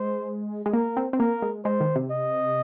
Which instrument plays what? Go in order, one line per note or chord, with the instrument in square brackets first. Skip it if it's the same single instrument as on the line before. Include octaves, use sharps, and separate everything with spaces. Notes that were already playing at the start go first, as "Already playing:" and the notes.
Already playing: [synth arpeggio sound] G#3 [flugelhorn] C5
[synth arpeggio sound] G#3
[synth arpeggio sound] A#3 [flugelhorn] A#4
[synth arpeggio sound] C4
C4
[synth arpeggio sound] A#3 [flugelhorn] A#4
[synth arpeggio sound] G#3
[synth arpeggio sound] G#3 [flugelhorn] C5
[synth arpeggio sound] D#3
C3
[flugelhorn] D#5